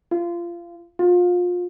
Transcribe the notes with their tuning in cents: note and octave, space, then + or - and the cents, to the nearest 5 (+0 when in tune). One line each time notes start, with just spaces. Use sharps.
F4 -25
F4 +30